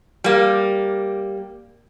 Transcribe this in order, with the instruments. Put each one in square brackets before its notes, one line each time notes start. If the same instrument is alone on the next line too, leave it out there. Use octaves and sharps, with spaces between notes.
[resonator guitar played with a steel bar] G3 A#3